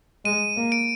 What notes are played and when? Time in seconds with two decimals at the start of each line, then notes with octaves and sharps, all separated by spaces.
0.25 G#3 D#7
0.56 A#3
0.72 D7